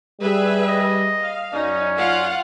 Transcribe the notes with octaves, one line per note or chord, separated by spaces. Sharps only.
G3 G#4 B4 E5
D#5
F5
F#2 C#4 D#4 D5
F4 F5 F#5